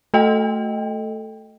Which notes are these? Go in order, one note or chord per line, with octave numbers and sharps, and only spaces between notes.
A3 A4 D#5 G5